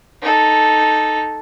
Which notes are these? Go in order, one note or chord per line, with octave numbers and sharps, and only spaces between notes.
D#4 A4